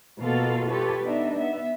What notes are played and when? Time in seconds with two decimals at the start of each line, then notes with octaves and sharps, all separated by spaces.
0.19 B2 A#3 B3 F4 A4 F5
0.70 F4 G4 A4 B4 C#5
1.04 B3 D4 D#4 E5
1.36 B3 E5